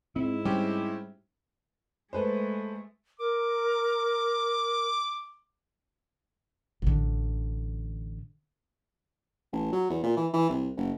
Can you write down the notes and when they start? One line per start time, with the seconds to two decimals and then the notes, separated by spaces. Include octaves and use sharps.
0.16 G#2 C4 E4
0.45 G3 C4 C#4 G4
2.13 G#3 A3 A4 B4 C5
3.20 A#4 D6
6.82 A1 D3
9.53 A1
9.73 F#3
9.90 E2
10.03 A#2
10.17 E3
10.34 E3
10.49 C2
10.77 F#1